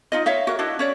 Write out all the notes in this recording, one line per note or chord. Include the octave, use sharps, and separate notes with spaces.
D#4 F4 D#5
C#5 E5 F5
F#4 A#4
D4 E4 F#4 D#5
C#4 C#5 D5